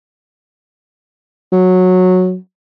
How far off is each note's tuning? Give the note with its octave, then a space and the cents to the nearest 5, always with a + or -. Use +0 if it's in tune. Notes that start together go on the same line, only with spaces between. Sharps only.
F#3 -10